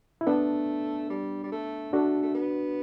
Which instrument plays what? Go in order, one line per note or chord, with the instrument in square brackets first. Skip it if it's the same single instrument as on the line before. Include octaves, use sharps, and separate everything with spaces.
[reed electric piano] E4
[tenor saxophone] A3 [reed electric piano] B3 D4
[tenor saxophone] G3
G3
A3
[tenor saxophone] A3 [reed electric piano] D4 F#4
[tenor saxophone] A3
B3